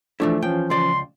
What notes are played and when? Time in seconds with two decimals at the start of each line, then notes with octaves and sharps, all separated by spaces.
0.20 E3 F3 A3 D4 E4
0.43 E3 F3 C#4 G5
0.70 C#2 D5 C6